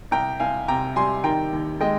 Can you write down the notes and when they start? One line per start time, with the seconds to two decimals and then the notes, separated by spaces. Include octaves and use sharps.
0.11 C2 G5 A#5
0.40 C2 F5 G#5
0.68 C3 G5 A#5
0.96 G3 G#5 C6
1.24 D#3 G5 A#5
1.53 D#2
1.81 G#3 D#5 G5